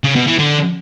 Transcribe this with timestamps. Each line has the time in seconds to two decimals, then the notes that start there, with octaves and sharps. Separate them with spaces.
0.04 C#3
0.15 B2
0.27 E3
0.39 D3